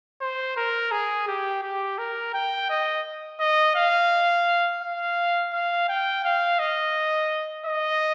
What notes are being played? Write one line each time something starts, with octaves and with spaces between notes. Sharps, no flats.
C5
A#4
G#4
G4
G4
A#4
G5
D#5
D#5
F5
F5
F5
G5
F5
D#5
D#5